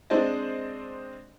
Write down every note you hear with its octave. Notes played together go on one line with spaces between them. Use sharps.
G#3 C4 D4 C5 D5 D#5